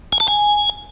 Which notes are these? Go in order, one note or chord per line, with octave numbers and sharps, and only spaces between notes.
G#5
A5
G#5